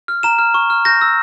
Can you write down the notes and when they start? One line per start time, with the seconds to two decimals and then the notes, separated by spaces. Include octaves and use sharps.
0.08 F6
0.23 A#5 E7
0.39 F6
0.54 C#6
0.70 F6
0.85 G6 A#6
1.01 E6